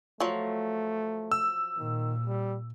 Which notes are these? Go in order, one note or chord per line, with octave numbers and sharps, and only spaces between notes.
F3 F#3 A3
E6
A#2 D#3
G3